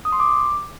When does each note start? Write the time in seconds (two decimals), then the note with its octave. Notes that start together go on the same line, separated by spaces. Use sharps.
0.05 D#6
0.12 C6
0.20 D6